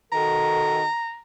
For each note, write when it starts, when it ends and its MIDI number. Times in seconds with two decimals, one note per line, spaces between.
0.12 0.83 51
0.12 0.83 66
0.12 0.83 69
0.12 1.20 82